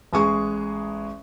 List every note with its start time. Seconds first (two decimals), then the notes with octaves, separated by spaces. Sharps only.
0.13 A1 G#3 G#4 C#6